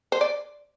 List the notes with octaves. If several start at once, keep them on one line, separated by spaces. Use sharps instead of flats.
C5
D5